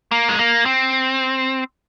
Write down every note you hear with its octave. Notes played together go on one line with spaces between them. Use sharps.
A#3
G#3
A#3
C4